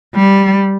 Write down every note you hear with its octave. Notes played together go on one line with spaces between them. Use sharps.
G3